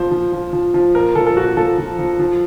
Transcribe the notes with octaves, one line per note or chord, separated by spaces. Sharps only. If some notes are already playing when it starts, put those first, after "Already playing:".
Already playing: A#2 F3 C5
F3
F3
F3
F3
A#2 A#4
F3 A4
A4
A#2 F#4
F3 A4
F3
F3
F3